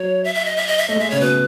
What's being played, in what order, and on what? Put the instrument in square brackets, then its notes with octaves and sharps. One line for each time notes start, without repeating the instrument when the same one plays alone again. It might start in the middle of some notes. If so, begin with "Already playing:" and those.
Already playing: [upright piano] F#3 [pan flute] C#5
[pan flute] E5
E5
D#5
E5
D#5
E5
[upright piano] A3 [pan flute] D#5
[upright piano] G#3
[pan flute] E5
[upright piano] C#3 [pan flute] C#5
[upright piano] B2 [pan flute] B4